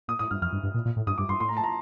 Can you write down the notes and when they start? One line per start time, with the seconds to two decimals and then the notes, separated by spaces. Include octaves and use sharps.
0.08 A#2 D#6
0.19 A2 D#6
0.31 G2 F6
0.42 F2 F6
0.53 G2
0.63 G2
0.74 A#2
0.85 A#2
0.96 A2
1.07 G2 D#6
1.18 G2 D6
1.29 G2 C6
1.40 A2 C6
1.49 A#5
1.57 A5
1.64 A#5